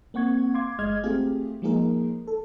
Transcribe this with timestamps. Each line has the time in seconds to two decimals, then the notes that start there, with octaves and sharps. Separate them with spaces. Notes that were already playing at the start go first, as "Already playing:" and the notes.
0.14 A#3 C4 F#5 C#6 G#6
0.54 F5 C6 D6 G#6
0.79 G1 G#3 D#5 F6 G#6
1.03 A3 C4 F4 G4 G#4
1.62 F3 G#3 A#3 D#4 G#4 A#4
2.28 A4